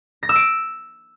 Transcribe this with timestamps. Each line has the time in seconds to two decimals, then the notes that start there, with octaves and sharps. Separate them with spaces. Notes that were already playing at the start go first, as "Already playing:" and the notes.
0.23 A#6
0.29 E6
0.35 D7